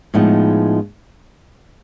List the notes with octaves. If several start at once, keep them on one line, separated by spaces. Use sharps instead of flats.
A2 F3 G#3 B3 D#4